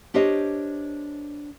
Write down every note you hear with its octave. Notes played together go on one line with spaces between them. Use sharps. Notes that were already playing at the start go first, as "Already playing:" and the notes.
D4 G4 A#4 C5 C#5 D#5